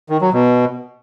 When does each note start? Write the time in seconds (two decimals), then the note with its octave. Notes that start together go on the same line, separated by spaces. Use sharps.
0.10 D#3
0.21 F#3
0.33 B2